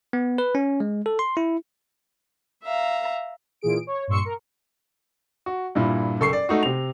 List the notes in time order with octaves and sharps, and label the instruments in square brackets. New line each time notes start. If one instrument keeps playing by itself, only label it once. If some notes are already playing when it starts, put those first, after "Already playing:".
[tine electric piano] B3
B4
C#4
G#3
A4
C6
E4
[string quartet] E5 F5 A#5
[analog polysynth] A#2 E3 G#4 D7
C#5
G2 A#2 C6 C#6 E6 C#7
A#4
[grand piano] F#4
G2 A#2 E4
F#1 A4 C#6 C7
D5
A3 D#4 F#4
C3 F7